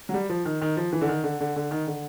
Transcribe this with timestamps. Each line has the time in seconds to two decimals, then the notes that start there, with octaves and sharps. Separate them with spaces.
0.09 F#3
0.14 G3
0.29 F3
0.45 D#3
0.61 D#3
0.77 F3
0.93 E3
1.01 D3
1.09 D#3
1.24 D3
1.40 D3
1.56 D3
1.71 D#3
1.87 D3